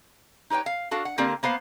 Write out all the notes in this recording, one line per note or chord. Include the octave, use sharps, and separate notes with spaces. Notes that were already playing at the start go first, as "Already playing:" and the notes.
D#4 G4 B4 C#5 G5
F5
D4 F#4 A4 F5
F#5
D3 A#3 C4 G4 A#4 D5
A#3 B3 C5 F5